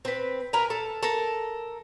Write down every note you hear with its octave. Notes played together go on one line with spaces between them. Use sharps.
C4 B4
A#4 B4 G#5 A#5
A4
A4 A#4